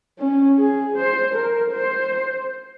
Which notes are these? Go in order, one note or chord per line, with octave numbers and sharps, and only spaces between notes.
C#4
G#4
C5
A#4
C5